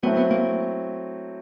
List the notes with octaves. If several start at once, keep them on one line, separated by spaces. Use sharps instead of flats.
F#3 A3 B3 C4 E4
B3
A#3